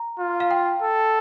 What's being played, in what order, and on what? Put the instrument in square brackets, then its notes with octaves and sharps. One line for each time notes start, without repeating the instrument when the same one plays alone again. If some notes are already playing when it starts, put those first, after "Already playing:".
Already playing: [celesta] A#5
[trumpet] F4
[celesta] F5
G5
[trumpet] A4